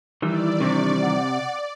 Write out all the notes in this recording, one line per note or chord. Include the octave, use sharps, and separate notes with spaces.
D#3 E3 G3 E4 D5 E6
C3 D4 C#6
F#5 D6